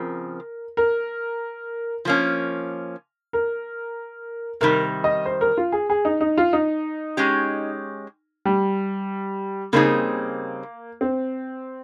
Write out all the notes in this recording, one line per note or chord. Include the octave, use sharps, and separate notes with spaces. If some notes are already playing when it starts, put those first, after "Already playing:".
Already playing: C#3 F3 C4 A#4
A#4
F3 A#3 C#4
A#4
C3 D#3 G3 A#4
D#5
C5
A#4
F4
G#4
G#4
D#4
D#4
F4
D#4
G#3 C#4 G4
G3
C#3 G3 A#3 C4 D#4 G#4
C4